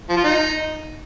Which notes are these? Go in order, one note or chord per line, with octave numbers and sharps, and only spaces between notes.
F3
F4
D#4